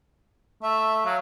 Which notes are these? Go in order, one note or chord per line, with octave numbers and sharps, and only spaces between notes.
A3 E5
F#3 F5